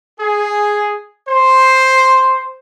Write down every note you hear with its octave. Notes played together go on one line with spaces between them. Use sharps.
G#4
C5